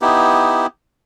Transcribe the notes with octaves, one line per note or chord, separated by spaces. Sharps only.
B3 D#4 E4 G4